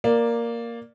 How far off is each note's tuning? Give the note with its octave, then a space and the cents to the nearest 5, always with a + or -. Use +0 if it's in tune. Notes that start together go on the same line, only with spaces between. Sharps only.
A#3 +0 D5 +0